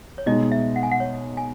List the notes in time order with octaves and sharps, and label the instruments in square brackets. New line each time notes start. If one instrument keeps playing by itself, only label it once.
[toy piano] C#5
[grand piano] B2 G#3 D#4 [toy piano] D#5
[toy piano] E5
F#5
G#5
F#5
C#5
G#5